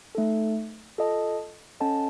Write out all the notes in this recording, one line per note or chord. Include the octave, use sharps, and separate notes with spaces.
A3 D#4 A4
F4 A4 D#5 A5
C#4 A4 D#5 F#5 A5